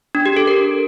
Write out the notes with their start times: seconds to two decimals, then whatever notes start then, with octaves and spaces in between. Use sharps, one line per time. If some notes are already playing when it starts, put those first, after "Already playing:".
0.15 D4
0.26 G4
0.37 A4
0.47 A#4